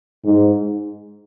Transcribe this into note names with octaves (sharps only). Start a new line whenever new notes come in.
G#2